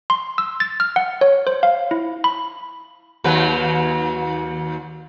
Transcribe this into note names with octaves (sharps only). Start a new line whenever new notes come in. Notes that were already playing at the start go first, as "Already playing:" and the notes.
C6
E6
A6
F6
F#5
C#5
C5
F5
E4
B5
D#2 F#3 B4